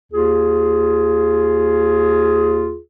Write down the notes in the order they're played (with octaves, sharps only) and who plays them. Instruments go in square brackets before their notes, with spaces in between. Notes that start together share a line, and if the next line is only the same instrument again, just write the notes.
[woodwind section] D#2 F4 G#4